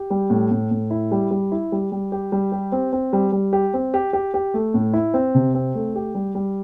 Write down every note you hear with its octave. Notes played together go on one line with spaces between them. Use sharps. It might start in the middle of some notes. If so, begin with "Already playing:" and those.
Already playing: G4
G3
A2
A2
A2
E4
G3
G3
E4
G3
G3
G4
G3
G4
C4
C4
G3
G3
G4
C4
G4
G4
G4
A3
A2
E4
C4
C3
C4
A3
G4
G3
G3